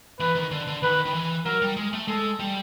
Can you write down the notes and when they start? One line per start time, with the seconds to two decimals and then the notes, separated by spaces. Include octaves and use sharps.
0.20 E3 B4
0.35 D#3
0.51 D3
0.67 D3
0.83 D#3 B4
1.05 D#3
1.14 E3
1.45 F#3 A#4
1.62 G3
1.77 G#3
1.93 A3
2.08 G#3 A4
2.40 G3